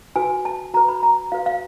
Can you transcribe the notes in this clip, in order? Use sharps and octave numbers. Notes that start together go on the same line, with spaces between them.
F#4 B4 G#5
A5
F#4 B4 A#5
B5
A#5
F#4 B4 F5
F5